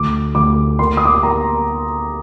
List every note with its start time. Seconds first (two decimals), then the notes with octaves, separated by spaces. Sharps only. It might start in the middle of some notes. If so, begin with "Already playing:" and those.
Already playing: D2 D6
0.35 D2 D6
0.79 A#3 C6
0.97 D#6
1.05 D6
1.15 C6
1.23 A#3 A#5